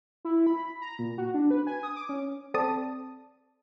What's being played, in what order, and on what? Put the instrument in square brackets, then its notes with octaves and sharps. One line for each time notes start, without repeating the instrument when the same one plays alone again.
[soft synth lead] E4
B5
A#5
A#2
F#4
D4
B4
G#5
D#6
D6
C#4
[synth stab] C4 A4 D5 A5 D#6